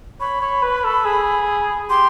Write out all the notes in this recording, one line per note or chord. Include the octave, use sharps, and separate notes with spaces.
C#5 B5
C#5
B4
A4
G#4
G4 C6